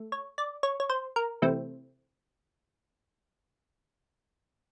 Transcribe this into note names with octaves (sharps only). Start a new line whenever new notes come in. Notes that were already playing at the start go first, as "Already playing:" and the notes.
Already playing: A3
C#5
D5
C#5
C#5
C5
A#4
C3 E3 A3 C4